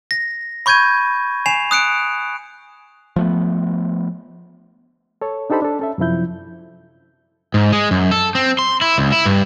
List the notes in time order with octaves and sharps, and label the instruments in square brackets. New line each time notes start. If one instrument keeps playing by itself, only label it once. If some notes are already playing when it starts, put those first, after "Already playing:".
[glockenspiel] A#6
B5 C#6 G6 G#6 D#7
G#5 C7 E7 F7
D#6 F#6 C#7 D7
[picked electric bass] F3 A3 B3
[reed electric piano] A4 C#5
D4 D#4 G4 A4 C5 B5
D4 A4
C#4 A4 E5
F#2 C3 F3 E4 G6
[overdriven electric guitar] G#2
G#3
F#2
A4
C4
C6
E4
C#2
E4
G2